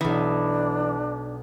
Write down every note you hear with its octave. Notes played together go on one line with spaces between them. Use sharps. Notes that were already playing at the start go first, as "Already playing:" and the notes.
B1 E3 D4 D#6